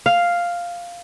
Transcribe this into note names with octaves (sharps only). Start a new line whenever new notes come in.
F5